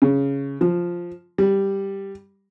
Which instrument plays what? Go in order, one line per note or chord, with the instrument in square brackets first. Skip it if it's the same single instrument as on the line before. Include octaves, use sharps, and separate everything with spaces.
[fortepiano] C#3
F3
G3